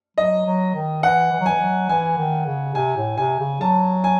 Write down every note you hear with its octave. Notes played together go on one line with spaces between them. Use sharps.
F#3 D#5
F#3
D#3
E3 F#5
E3
F#3
E3 G#5
F#3
E3 G#5
D#3
C#3
C3 G#5
A2
C3 G#5
C#3
F#3 A5
G#5